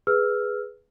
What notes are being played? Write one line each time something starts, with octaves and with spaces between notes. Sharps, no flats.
G#4 B4 E6 F6